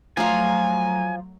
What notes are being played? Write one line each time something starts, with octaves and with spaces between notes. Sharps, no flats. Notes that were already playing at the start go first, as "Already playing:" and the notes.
F3 F#3 A3 F4 G#5 A#5